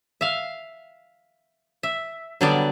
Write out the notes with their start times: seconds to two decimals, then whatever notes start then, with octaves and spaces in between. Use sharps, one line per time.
0.21 E5 F5
1.83 E5
2.41 D3 F#3 G3 B3 D5